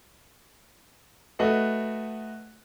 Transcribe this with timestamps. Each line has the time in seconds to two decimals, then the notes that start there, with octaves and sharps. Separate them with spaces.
1.39 A3 F#4 B4 D#5 F#5